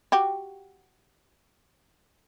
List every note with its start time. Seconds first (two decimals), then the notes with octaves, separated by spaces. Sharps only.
0.12 F#4 G4